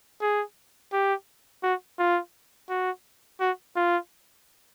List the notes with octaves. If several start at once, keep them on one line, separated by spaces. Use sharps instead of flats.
G#4
G4
F#4
F4
F#4
F#4
F4